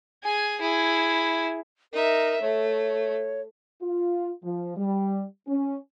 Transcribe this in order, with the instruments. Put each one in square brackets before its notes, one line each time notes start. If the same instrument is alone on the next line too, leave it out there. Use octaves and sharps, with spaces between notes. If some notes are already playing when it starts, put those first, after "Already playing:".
[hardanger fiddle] G#4 G#5
E4 G#4
[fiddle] D#4 E5 [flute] A#4
[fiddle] A3 [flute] C#5
[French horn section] F4
F3
G3
C#4